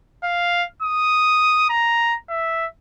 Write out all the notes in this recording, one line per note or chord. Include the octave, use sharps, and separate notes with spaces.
F5
D#6
A#5
E5